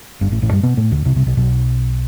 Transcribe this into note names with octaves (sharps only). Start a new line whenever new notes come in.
G1 G2
A1 A2
A1 A2
G2 G3
B2 B3
A2 A3
D2 D3
C2 C3
C2 C3
B1 B2
B1 B2